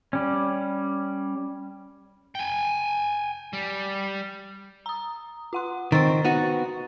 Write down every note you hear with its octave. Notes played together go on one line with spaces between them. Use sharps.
G3 C#4
G5 G#5
G3
A#5 D#6
F4 F#5 C6
D#3 C4 A#5 C#6 A6
B3 D#4 F#4